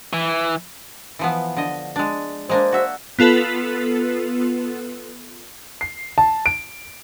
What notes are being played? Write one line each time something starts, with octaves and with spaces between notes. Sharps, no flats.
E3
E3 F3 B3
D3 D#5
G#3 D4
G#3 A#3 D4 C5
F#4 E5
B3 F4 A4 B4
C7
A5
D7